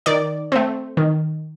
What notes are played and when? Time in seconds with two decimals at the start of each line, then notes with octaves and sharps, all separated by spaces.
0.06 D#3 D5
0.52 A3 C4
0.97 D#3